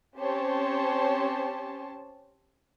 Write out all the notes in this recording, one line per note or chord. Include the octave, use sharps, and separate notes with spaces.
C4 C#4 G4 C5 C#5 A5